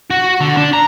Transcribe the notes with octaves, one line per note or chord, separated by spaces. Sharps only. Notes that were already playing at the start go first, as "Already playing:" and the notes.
F#4
D3
D4
A#5